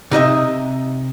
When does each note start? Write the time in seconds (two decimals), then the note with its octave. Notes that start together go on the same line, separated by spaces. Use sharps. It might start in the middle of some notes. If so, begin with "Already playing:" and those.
0.11 C3 D#4 D#5 E5